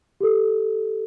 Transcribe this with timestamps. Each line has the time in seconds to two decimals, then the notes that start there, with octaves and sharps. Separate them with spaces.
0.21 G4 A4